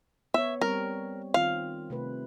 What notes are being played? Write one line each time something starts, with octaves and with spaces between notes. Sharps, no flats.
B3 C#5 E5
G3 C4 A#4
D#3 C4 F4 F5
C3 A3 B4